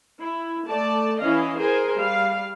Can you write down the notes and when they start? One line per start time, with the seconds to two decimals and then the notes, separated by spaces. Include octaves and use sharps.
0.19 E4
0.67 A3 D5 A5
1.22 E3 C#4 E4 D#5 F5
1.57 G#4 A#4 C5 G#5
1.95 G3 F5